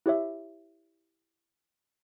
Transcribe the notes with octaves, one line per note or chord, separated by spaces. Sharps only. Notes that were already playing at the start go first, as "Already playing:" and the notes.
E4 G4 C#5 E5